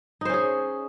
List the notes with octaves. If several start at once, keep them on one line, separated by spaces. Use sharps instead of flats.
C#4 D#4 G#4 C5